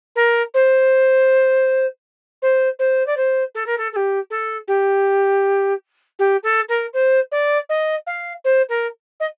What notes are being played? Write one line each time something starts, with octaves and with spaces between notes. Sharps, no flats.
A#4
C5
C5
C5
D5
C5
A4
A#4
A4
A4
G4
A4
G4
G4
A4
A#4
C5
D5
D#5
F5
C5
A#4
D#5